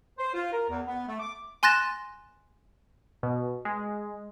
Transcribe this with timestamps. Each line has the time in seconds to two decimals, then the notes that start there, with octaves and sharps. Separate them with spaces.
0.18 C5
0.34 F4
0.52 A#4
0.69 E2
0.87 B3
1.08 A3
1.19 D6
1.63 G#5 C6 F#6 A6 A#6 E7
3.23 B2
3.65 G#3